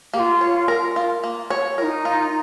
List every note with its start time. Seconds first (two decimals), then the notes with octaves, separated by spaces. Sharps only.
0.13 A#3 G4
0.19 F4
0.41 C#5
0.68 A#4
0.96 F4
1.24 A#3
1.50 C#5
1.78 F4 A#4
1.83 D#4
2.05 F4